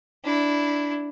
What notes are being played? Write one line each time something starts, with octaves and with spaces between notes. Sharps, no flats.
D4 E4